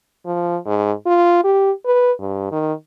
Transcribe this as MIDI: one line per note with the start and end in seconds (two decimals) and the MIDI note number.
0.26 0.57 53
0.66 0.92 44
1.06 1.40 65
1.44 1.71 67
1.86 2.12 71
2.20 2.51 43
2.52 2.73 51